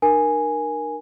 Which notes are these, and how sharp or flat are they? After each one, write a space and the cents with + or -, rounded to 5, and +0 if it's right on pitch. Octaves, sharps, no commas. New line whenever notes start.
D#4 -45 A#4 +10 G#5 +0